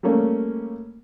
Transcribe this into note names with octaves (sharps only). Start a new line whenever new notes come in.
G3 A3 A#3 C#4